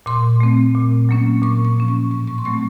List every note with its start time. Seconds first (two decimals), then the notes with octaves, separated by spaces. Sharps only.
0.06 A#2 C6
0.40 A3 C4
0.75 A#2
1.09 F#3 A#3 C#4
1.42 A#2 C#6
1.65 C#6
1.77 F3 A#3 C#4
1.88 C#6
2.11 A2 C#6
2.27 C#6
2.38 C6
2.45 F#3 A3 C4 C#6